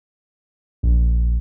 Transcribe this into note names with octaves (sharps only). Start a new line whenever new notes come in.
A#1